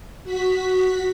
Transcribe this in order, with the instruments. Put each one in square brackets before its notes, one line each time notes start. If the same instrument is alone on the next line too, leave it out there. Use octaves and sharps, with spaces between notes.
[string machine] F#4 B6